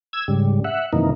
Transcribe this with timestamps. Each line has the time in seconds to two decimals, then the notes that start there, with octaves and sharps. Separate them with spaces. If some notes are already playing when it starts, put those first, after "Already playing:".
0.13 E6 G#6
0.28 G#2 C#3 G3
0.64 E5 F#5
0.93 F#2 C3 D#3 E3 A#3 D#4